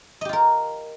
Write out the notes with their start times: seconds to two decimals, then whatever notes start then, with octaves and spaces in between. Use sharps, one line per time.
0.21 D#5
0.25 G4
0.29 F4
0.33 A#4